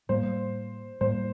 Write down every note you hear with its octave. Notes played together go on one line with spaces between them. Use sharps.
A2 G3 A#3 C5
A2 G3 A#3 C5